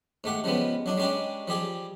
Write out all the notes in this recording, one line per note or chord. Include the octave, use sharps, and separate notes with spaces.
G#2 A3 G4 F#5
C#3 F3 G3 G#3 B3
F#3 D4 D#4
G3 G#3 C#4 D4 G4
F3 G3 G4 G#4